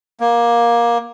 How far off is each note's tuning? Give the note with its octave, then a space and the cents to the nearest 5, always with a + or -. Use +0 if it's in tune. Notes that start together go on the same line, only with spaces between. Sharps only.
A#3 +15